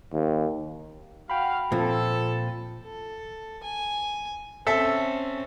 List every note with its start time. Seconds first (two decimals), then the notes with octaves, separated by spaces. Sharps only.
0.13 D#2
1.30 F#4 F5 G5 B5
1.72 A#2 F3 C4 A4
2.85 A4
3.63 G#5
4.67 C4 C#4 A4 E5